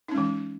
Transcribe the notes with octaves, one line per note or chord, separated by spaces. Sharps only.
E3 G#3 C#4 D#4